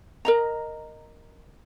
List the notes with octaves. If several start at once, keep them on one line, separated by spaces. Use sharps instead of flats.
A#4 D#5 A#5